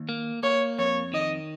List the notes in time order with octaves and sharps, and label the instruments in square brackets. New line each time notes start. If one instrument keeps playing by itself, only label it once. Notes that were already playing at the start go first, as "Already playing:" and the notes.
Already playing: [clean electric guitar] D#2
A#3
[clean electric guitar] A#3 [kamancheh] C#5
[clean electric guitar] F2 [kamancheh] C#5
[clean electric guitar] D#3 [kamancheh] D#5